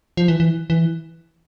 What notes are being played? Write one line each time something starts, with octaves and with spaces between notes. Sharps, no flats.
F3
E3
E3
E3